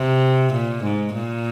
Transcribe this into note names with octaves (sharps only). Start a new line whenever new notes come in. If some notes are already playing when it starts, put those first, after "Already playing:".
Already playing: C3
A#2
G#2
A#2